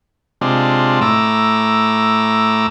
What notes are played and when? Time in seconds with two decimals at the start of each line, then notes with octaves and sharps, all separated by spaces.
0.41 C3 G#3 D4 F4
1.01 A2 A#5 D6 E6